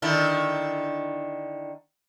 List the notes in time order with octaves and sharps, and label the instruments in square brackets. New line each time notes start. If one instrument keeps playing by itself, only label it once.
[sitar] D3 D#3 E4